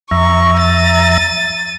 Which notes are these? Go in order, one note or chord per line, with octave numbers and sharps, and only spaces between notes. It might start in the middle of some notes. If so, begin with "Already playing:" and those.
F2 E5 A#5 C#6
A6 D#7